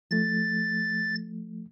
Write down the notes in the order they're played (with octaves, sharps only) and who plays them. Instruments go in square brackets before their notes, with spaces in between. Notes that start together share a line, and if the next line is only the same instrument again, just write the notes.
[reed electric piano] F3 A3 [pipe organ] A6